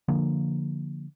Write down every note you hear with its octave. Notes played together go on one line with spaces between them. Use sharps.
D3 F3 A#3